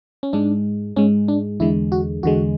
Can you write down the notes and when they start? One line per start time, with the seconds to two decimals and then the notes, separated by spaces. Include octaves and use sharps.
0.23 C#4
0.33 G#2 G#3 D4
0.96 G#2 G#3 C#4
1.28 D4
1.60 E2 D3 G#3 E4
1.92 F#4
2.23 E2 D3 G#3 F#4